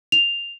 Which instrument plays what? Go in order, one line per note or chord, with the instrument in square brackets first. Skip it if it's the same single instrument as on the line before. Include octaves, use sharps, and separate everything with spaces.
[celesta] F7